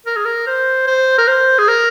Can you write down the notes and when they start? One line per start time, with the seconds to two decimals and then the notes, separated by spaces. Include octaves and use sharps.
0.07 A#4
0.16 G#4
0.25 A#4
0.47 C5
0.87 C5
1.18 A#4
1.28 C5
1.58 G#4
1.68 A#4